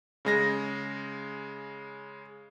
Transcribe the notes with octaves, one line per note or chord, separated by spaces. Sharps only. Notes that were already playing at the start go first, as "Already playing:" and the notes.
C#3 G#3 A#6